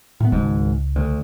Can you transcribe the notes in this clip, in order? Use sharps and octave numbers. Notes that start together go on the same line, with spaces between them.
A2 B3
G#1 C#2 G#2
D2